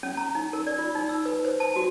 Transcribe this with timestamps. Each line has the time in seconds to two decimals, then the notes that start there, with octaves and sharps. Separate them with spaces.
0.03 C#4
0.17 A#5
0.35 D#4
0.53 A#4
0.67 D5
0.78 F4
0.95 D#4
1.09 E6
1.25 B4
1.45 C5
1.60 A5
1.76 F#4